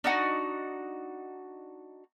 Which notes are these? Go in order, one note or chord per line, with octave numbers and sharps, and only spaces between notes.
D4 D#4 F#4